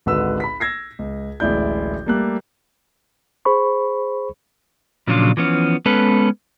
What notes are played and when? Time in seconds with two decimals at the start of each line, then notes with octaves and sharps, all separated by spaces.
0.06 G#1 C#2 D3 F#4 B4 E6
0.40 B5 B6
0.60 E6 G#6 A#6 C7
0.99 C#2
1.40 D1 A1 G#3 E4 D5 G6
2.06 G3 A3 A#3 A4 F#6
3.45 G#4 C5 B5 C#6
5.07 A#2 C#3 F3 F#3 D4 F4
5.37 E3 F3 B3 C#4
5.86 G#3 B3 C#4 A4 B4